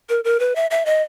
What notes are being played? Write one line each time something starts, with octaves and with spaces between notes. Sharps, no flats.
A#4
A#4
B4
E5
E5
D#5